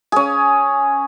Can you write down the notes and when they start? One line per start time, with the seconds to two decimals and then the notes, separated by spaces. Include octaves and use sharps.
0.12 C#4 G#4